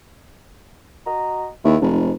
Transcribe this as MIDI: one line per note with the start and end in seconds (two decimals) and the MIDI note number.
1.07 1.48 66
1.07 1.48 75
1.07 1.48 82
1.64 1.76 39
1.64 1.81 64
1.81 2.12 29
1.81 2.10 44